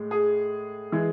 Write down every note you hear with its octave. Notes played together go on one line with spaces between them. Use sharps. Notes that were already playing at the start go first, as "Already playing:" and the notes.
Already playing: A2 G#3
G#4
E3 G#3